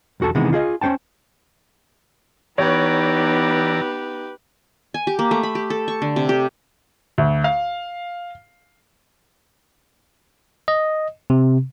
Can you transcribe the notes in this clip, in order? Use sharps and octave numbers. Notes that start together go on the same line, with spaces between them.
B1 E2 F#4 A4 A5
C3 D#3 E3 G#3 B3
F4 G#4 D#5
C#4 D#4 C5 G5 A5
E3 B3 D#4 G4 B4 C#5 D5 A#5
G#5
G4
A#3
A3
B5
G4
A4
C#6
D3
C3
G4
D2
F5
D#5
C3